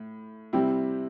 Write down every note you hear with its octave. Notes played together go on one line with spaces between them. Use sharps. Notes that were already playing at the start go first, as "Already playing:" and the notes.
Already playing: A2
C3 G3 C4 E4 G4